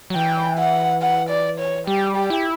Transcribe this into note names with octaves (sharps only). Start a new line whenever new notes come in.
F#3
E3 G5
F#5
F#5
D5
C#5
G3 G4
G4
E4